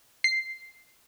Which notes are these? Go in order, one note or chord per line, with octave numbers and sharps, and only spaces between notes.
C7